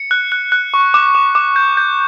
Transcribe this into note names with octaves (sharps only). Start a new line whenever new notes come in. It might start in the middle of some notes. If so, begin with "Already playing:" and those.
Already playing: C#7
F#6
F#6
F#6
C#6
D6
D6
D6
G6
G6